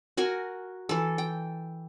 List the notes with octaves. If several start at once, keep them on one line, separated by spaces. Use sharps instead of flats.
F#4 A#4 G#5
E3 A4
G5